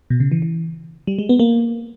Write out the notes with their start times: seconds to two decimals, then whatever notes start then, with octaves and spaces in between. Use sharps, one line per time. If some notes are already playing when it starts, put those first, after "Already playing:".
0.10 B2
0.20 C#3
0.32 E3
0.42 E3
1.07 G3
1.19 G#3
1.29 B3
1.39 A#3